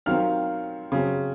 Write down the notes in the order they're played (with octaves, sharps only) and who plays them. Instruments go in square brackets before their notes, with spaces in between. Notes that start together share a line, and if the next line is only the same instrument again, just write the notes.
[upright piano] D#3 F#3 C4 F5 F6
C#3 F#3 C4